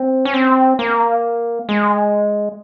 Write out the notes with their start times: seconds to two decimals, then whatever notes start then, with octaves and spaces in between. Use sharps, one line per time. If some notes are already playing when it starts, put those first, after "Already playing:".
Already playing: C4
0.25 C#4
0.34 C4
0.79 A#3
1.69 G#3